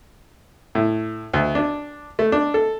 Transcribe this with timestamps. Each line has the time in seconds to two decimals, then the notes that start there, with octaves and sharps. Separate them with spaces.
0.75 A2
1.34 D2
1.55 D4
2.19 A3
2.32 D4
2.54 A4